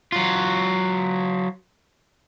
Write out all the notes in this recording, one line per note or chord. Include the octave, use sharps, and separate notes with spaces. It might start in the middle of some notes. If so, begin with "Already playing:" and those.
F#3 F4